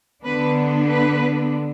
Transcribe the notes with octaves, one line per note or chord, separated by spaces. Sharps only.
D3 B3 D4 B4
B4